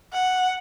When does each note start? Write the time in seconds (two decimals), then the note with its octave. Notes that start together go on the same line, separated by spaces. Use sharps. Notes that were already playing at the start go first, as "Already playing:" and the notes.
0.13 F#5